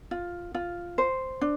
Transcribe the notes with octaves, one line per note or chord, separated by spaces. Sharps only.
F4
F4
C5
D4